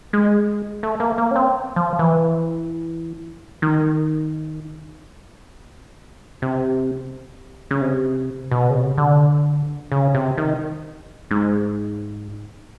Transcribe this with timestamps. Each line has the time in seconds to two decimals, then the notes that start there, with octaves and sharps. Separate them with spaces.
0.13 G#3
0.83 A3
1.00 A#3
1.18 A#3
1.31 C#4
1.36 C4
1.76 F3
1.99 E3
3.62 D#3
6.42 C3
7.71 C#3
7.81 C3
8.51 B2
8.70 C#3
8.75 C3
8.98 D3
9.92 C#3
10.15 C3
10.38 D#3
11.31 G#2